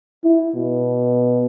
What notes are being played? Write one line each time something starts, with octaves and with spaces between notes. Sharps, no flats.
E4
B2